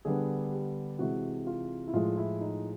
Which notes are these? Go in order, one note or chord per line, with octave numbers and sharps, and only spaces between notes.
D3 G3 B3 G#4
G4
C3 E3 G#3 F#4
F4
E4
A2 F3 G#3 F4
E4
D#4